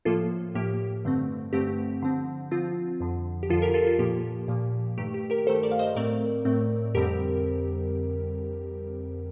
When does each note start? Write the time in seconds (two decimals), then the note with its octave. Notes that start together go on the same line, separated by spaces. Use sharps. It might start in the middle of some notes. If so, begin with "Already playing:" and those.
0.05 A2 F3 A#3 F4 A4
0.55 A2 F3 A#3 G4
1.05 G2 D3 A3 C4
1.53 G2 D3 A3 C4 G4
2.02 D3 F3 C4
2.51 D3 F3 C4 F4
3.00 F2 D3 F3
3.43 G4
3.49 F2 D3 F3 F4 A4
3.62 G4 A#4
3.74 F4 A4
3.87 F4 A4
3.99 A#2 F3 A#3 G4
4.48 A#2 F3 A#3
4.98 G2 D#3 A3 G4
5.14 G4
5.30 G4 A#4
5.46 G2 D#3 A3 A4 C5
5.63 A#4 D5
5.71 F5
5.79 C5 D#5
5.95 A2 A3 C4 A#4 D5
6.45 A2 A3 C4
6.95 F2 D3 G3 C4 G4 A#4